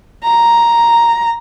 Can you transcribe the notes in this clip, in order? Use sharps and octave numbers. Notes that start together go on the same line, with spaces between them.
A#5